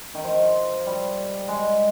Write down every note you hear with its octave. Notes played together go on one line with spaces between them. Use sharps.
D#3
F3
G3
G#3